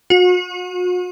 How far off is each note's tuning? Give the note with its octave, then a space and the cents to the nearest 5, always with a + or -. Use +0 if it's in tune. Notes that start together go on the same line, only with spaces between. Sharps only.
F#4 -40